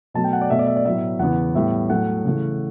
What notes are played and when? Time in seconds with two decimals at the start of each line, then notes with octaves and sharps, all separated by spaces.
0.14 B2 F#3 A3 A5
0.24 G5
0.33 F#5
0.41 D5
0.50 B2 A3 E5
0.59 D5
0.67 E5
0.77 D5
0.85 A2 F#3 B3 E5
1.19 E2 C#3 E3 B3 F#5
1.55 A2 G3 B3 E5
1.90 A2 F#3 A3 F#5
2.25 C#3 E3 A3